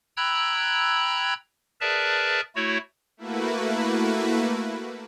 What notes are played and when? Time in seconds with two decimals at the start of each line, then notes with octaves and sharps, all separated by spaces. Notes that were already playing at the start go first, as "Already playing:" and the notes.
0.17 G5 A#5 B5 E6 F#6 G#6
1.81 G#4 A#4 B4 D5 E5 A5
2.56 A3 E4 F#4 C#5
3.17 A3 A#3 E4 F#4 B4